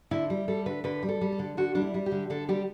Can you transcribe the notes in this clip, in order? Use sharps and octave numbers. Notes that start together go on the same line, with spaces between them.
D3 E4
G3
G3 A4
D3 B4
D3 B4
G3 G4
A4
G3
A4
D3
D3 F#4
G3 D4
E4
G3
G4
D3
D3 A4
G3 G4